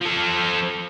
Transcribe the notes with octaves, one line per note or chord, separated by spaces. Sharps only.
F3 A4